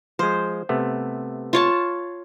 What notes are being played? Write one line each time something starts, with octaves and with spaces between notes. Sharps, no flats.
F3 G#3 C5
C3 A3 B3
F4 C#5 A5